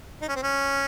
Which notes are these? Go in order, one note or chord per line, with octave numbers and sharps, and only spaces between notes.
D#4
C#4
C4
C#4